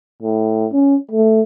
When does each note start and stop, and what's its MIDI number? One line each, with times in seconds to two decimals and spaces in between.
0.22 0.66 45
0.73 0.96 61
1.11 1.42 57